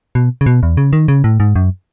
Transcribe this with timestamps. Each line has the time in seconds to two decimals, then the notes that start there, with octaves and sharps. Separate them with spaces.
0.15 B2
0.41 C#3
0.46 B2
0.63 E2
0.77 C#3
0.93 D#3
1.08 C#3
1.24 A2
1.40 G#2
1.56 F#2